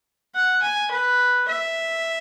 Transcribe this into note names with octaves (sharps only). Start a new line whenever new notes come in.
F#5
G#5
B4
E5